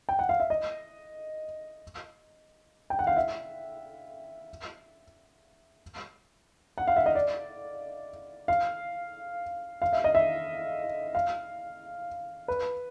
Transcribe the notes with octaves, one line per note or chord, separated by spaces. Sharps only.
G5
F#5
F5
E5
D#5
G5
F#5
F5
E5
F#5
F5
E5
D#5
D5
F5
F5
E5
D#5
E5
F5
B4